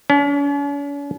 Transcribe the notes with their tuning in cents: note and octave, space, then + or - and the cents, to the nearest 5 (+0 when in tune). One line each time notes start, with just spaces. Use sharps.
C#4 +45